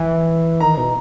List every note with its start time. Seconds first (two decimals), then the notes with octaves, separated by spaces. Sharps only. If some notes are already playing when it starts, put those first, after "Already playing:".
Already playing: E3
0.61 D#3 A#5
0.77 B2